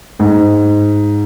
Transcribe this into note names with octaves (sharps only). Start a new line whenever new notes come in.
G#2